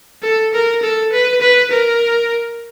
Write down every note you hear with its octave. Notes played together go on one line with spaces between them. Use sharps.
A4
A#4
A4
B4
B4
A#4